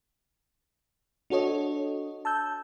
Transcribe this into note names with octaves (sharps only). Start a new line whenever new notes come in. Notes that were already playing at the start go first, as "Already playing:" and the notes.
D4 F#4 A4 C#5 D#5
A5 E6 G6